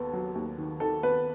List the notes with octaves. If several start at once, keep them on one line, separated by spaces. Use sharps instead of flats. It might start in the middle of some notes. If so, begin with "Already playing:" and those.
Already playing: D#2 B3 A4
F#3
D#2
D#3
D#3 A4
B3 B4